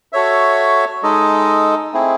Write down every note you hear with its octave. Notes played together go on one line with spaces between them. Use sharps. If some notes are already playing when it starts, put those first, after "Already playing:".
F#4 A4 C#5 E5
G#3 D#4 A4 D#5
A3 C4 E4 G#4